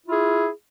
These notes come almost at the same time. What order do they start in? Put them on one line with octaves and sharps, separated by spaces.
E4 F4 G#4